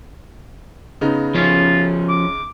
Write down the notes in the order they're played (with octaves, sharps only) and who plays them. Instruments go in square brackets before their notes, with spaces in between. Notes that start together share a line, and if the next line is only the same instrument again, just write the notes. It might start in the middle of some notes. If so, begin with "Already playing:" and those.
[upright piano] C#3 B3 D#4
[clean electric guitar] F3 C#4 [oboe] F4
[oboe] D6